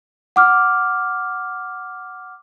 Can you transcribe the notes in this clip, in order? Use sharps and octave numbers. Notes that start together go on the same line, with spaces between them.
F#5 D6 F6